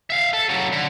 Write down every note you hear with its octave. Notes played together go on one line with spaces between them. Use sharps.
E5 F5
A4
C#3 F#3
D3